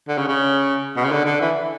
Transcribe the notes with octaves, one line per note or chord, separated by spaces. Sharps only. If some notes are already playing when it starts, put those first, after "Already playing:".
D3
C#3
C#3
B2
C#3
D3
D3
E3